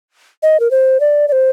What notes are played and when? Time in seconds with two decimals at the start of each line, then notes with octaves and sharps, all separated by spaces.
0.43 D#5
0.60 A#4
0.71 C5
1.00 D5
1.28 D5
1.32 C5